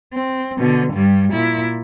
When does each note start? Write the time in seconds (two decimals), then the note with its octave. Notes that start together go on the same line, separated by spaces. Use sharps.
0.14 C4
0.59 B2 D3
0.94 G2 G3
1.33 A#2 E4